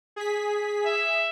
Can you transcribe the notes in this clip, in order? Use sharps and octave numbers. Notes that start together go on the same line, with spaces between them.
G#4 B6
E5